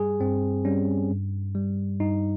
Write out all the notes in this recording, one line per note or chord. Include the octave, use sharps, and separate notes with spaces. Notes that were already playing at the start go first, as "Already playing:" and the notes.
Already playing: G2 G3 G#4
G2 C4
G3 C#4
G2
G3
G2 D#4